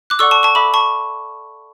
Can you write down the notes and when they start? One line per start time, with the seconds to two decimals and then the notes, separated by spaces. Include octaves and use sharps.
0.10 D6 F#6
0.19 A4 D5 F#5 C#6 E6
0.31 A5 C#6
0.43 A5 C#6
0.55 A4 E5 B5 D6
0.74 A5 C#6